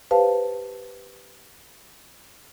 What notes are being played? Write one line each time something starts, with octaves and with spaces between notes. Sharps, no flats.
G4 B4 C5 F5 A5